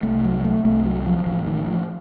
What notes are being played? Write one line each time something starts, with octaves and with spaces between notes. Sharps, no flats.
C2 C3 A3
F#3
A3
C2 C3 A3
F#3
F3
A1 A2 F3
D#3
F3